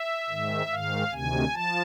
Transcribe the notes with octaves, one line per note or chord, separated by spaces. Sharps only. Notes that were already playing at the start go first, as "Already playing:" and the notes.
Already playing: E5
G#2 D#3
G#2 D#3 F5
D2 C3 D#3 G#5
F3 A5